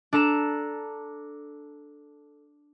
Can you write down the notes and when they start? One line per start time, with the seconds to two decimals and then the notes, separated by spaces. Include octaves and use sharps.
0.13 D4 A4 A#5 E7